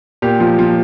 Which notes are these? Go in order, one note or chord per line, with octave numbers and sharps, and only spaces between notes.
A#2 G4
F3
F3